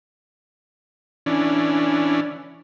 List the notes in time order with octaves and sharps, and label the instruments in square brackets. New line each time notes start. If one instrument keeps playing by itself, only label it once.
[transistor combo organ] E3 C#4 D4